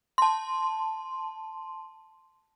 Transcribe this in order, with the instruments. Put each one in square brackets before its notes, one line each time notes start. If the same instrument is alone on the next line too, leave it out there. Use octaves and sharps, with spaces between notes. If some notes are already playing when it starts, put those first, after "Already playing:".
[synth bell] A5 C6